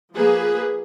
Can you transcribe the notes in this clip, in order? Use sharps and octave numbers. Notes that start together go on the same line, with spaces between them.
F3 A#3 G#4 B4